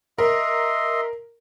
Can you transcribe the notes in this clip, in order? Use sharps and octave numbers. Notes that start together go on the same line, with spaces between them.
A#4 D#5 E5 C6